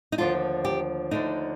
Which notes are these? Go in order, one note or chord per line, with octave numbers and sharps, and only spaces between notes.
D#4
D#2 D3 F3 A3 D4 F4
G4
D#2 D3 F3 A3 D4 D#4